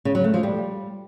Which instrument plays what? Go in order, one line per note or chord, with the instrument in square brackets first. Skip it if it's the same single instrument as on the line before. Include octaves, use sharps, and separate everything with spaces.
[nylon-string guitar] C#3
F#3
A3
F3
G3